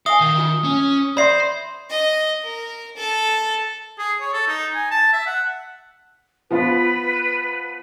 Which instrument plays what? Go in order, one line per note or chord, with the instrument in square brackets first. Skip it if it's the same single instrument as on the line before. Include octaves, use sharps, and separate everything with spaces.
[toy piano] E5 G#5 [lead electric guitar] F5 [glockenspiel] D#6 G7
[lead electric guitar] D#3
[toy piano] F4
[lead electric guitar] C#4
[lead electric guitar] C5 [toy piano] D5 E5 C6 [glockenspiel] B5 C7
[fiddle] D#5
A#4
A4
[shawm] G#4
C#5
A4
D#4
G#5
A5
E5
F#5
[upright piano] F3 B3 F4 [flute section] B4